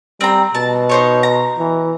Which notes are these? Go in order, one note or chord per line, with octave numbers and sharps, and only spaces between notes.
G3 C4 A#5
B2 A5
D#4 C5 C#5
A#5
E3